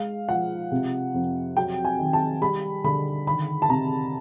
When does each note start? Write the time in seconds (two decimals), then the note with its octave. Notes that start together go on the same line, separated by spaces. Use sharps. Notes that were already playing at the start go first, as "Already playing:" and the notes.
Already playing: G#3 F5
0.29 F3 F#5
0.71 C3
1.14 F2
1.57 F#3 G5
1.85 G#5
1.99 D#3
2.13 A5
2.42 G3 B5
2.84 D3 B5
3.27 D#3 B5
3.62 A5
3.69 C3 A#5